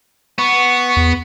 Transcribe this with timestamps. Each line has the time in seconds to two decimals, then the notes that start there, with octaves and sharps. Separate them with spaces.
0.38 B3 C#6
0.96 E2